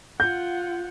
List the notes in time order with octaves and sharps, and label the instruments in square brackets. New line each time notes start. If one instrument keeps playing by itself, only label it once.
[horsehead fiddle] F4 F#5 [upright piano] G6